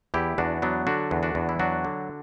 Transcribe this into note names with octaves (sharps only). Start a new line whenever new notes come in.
E2 E4 G4
E2 D4 F#4
F#3 B3 D4
D3 D4 F#4
E2
D4 F#4
E2
E4
F#3 D4 F#4
D3